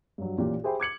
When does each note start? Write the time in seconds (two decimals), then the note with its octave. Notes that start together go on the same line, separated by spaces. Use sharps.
0.18 G2 F#3
0.38 A1 A#2 G4
0.64 G4 G#4 C5 E5 G5 B5
0.80 D6 G#6 C#7 F#7